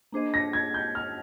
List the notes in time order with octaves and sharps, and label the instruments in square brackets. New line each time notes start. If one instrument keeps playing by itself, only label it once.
[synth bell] A#3 D4 G#4 C5 D#5
[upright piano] A#6
G#6
G6
F6